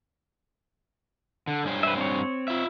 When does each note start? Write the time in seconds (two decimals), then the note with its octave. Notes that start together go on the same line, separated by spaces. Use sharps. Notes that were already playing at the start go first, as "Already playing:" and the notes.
1.47 D3
1.64 G2 C#4 C5
1.83 B4 E5
1.98 C4 C#5
2.48 F4 E5